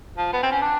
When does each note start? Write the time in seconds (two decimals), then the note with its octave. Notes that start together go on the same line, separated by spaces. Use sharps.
0.17 F3
0.33 B3
0.43 C4
0.51 C#4
0.61 D4